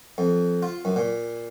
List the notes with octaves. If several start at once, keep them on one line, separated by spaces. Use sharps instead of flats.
F2
F4
F#2
A#2